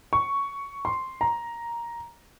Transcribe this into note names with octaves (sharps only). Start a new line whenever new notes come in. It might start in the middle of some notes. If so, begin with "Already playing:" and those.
C#6
C6
A#5